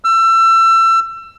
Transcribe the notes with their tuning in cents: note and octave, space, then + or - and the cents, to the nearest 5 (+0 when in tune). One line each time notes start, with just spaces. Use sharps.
E6 +30